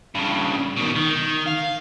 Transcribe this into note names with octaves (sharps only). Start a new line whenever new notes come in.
G2 C#3
B2 D#3
D#3
F5